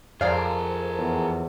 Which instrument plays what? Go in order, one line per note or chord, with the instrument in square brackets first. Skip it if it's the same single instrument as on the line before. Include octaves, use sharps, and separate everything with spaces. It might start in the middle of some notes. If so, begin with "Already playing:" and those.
[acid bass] F2 [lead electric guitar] G#4 A#4 [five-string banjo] C5 D5 F5
[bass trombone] E2